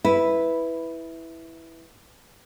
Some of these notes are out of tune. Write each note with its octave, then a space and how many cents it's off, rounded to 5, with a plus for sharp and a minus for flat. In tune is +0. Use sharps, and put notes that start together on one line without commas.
E4 -5 B4 +0